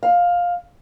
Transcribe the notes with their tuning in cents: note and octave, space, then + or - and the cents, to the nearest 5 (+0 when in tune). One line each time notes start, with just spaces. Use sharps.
F5 +10